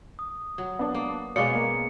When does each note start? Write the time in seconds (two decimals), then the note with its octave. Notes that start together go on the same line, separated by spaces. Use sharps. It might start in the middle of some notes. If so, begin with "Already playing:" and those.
0.19 D#6
0.58 F#3
0.79 B3 D4
0.95 A#3
1.36 B2 G#3 C#4 D5 F5 D6 C#7
1.55 A#3